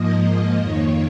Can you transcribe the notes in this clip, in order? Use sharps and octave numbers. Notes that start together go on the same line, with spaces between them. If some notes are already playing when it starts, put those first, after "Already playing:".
Already playing: G#2 F3 A#3 D#5
F2 D#3 A#3 C#5